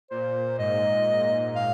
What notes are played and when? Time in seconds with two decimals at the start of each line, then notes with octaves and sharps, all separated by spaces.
0.11 A#2 C5
0.58 G#2 D#5
1.55 F5